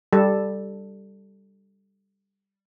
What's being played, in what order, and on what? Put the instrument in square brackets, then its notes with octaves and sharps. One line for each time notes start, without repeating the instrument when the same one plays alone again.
[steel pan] G3 A4